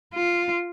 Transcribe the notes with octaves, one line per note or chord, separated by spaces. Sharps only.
F4